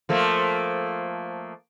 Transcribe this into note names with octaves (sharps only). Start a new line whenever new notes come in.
F3 A3 A#3